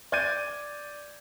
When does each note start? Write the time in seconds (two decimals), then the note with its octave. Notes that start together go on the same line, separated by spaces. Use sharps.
0.12 D5 G6 G#6 D#7